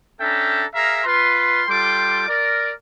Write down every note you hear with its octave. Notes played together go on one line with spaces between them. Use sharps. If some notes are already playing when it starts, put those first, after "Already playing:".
C#4 D4 A4 E5 G5 A#5
G#4 A#4 E5 F5 A#5
F4 B4 C6
G3 F4 A4 G5 C6 D6
A#4 D5